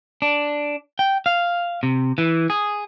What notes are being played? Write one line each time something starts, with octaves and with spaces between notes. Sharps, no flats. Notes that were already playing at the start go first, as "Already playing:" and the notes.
D4
G5
F5
C3
E3
G#4